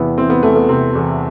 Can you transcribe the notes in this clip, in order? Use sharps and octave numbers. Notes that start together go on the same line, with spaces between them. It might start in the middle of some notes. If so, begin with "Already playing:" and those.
Already playing: E2 C3 B3 E4
E3 C4
B3
E2 A3
B3
C3 C4
E2